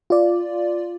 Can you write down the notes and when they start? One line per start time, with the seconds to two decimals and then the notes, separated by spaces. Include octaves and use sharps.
0.10 F4 D5